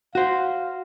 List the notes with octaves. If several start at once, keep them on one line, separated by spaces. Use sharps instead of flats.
F#4 C5 F5